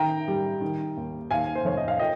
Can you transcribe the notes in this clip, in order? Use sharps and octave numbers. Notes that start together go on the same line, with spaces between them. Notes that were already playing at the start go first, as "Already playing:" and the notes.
Already playing: D#3 G5 A#5
G3
D#3
D#2
D#2 F5 G#5
C5
F1 C#5
D#5
F5
F3 D#5 G5